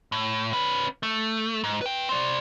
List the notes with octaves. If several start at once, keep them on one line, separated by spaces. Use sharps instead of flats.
A2
C#4 B4
A3
G#2
B4 G5
C5 D5